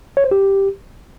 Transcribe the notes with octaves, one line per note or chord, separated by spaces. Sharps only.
C#5
C5
G4